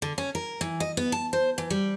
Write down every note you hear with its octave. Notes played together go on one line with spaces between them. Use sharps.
D3
C#4
A#4
E3
D#5
B3
A5
C5
E3
G3